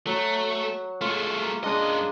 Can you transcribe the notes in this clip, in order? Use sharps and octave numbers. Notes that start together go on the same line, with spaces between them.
F#3 A3
G#3 A3 F4
A#3
F#2 G#3 D4 G#4 D#5